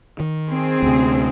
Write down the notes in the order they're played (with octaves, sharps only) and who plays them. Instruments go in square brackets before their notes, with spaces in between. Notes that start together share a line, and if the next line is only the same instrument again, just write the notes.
[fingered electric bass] D#3
[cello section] C4 G#4
[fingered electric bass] D2 C3